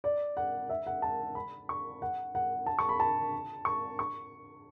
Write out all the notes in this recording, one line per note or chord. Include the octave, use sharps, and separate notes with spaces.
D5
F#5
E5
F#5
A5
B5
C#6
F#5
F#5
A5
C#6
B5
A5
C#6
C#6